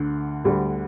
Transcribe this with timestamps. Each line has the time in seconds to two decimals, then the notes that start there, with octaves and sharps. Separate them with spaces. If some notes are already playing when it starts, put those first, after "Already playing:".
Already playing: D2 D3
0.44 D2 D3 G3